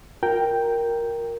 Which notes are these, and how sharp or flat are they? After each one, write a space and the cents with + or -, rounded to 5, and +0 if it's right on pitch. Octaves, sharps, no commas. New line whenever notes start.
F4 +40 A#4 +0 G5 +0